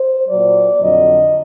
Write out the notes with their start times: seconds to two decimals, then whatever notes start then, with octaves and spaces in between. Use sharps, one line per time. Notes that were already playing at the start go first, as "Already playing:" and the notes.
Already playing: C5
0.28 F#3 D5
0.33 A#2
0.80 F2 D3 F#3 D#5